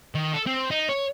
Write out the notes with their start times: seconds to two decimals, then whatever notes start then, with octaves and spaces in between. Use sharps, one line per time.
0.15 D#3
0.33 A4
0.47 C4
0.71 D#4
0.89 C#5